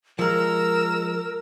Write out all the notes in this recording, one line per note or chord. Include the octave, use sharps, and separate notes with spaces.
F3 G#3 A#4 A#5 E6